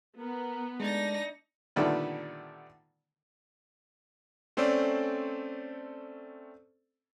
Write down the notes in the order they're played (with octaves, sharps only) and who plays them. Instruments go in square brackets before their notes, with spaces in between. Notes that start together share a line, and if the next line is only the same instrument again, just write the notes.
[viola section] B3 [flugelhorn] A#4
[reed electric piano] G#3 A3 [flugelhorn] D4 [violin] D#4 A#6
[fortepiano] A#2 D3 D#3 G3 A3 B3
[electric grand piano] A3 C4 C#4 A4 C5 D5